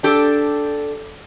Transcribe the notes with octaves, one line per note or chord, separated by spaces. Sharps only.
D4 G4 A4